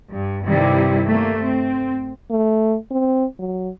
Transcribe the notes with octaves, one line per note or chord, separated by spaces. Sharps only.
G2
G2 C3 D#3 G3 E4
A3 A#3
C4
A3
C4
F#3